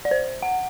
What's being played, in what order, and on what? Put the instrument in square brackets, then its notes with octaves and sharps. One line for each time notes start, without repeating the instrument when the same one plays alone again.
[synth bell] D5
C5
F#5